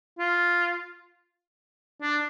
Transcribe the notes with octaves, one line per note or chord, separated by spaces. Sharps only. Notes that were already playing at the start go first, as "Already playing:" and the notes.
F4
D4